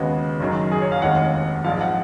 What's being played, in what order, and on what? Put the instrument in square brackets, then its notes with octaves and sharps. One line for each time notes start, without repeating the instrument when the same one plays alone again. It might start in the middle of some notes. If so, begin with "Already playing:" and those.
Already playing: [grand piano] D#2 C#3 G#3 B3 F#4
F#1 F#2 D#3
G#4
C#5
F5
F1 D#2 D#3 G#3 F#5
A#1 G#2 F3 F5
F#5